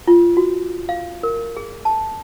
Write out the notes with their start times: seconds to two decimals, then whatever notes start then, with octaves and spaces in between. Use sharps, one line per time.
0.07 F4
0.37 F#4
0.89 F5
1.23 A#4
1.57 G#4
1.85 A5